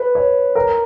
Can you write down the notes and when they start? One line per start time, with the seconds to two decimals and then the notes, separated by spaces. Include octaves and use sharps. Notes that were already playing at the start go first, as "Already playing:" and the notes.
Already playing: B4
0.15 C#5
0.55 A#4